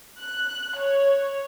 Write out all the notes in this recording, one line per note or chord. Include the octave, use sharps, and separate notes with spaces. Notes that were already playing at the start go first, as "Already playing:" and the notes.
F#6
C#5